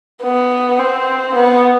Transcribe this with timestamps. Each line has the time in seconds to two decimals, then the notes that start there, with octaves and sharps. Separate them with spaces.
0.22 B3
0.79 C4
1.35 B3